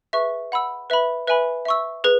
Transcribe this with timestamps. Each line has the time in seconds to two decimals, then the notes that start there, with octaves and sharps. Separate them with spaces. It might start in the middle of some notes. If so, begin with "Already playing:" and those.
0.13 G#4 B4 E5 C#6
0.52 F#5 B5 E6
0.90 B4 E5 B5
1.27 B4 E5 G#5 B5
1.65 E5 C#6 E6
2.04 G#4 B4